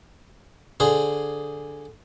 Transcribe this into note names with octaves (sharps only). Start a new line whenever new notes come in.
D3 G#4 C5